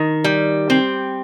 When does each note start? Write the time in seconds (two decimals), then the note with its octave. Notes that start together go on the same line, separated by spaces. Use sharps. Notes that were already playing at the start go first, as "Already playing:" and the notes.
Already playing: D#3
0.24 G3
0.70 C4